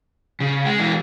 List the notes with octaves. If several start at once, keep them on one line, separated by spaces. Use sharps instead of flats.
C#3
G#3
E3